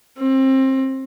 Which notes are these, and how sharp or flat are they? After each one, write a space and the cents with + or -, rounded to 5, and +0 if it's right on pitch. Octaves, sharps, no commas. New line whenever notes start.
C4 +25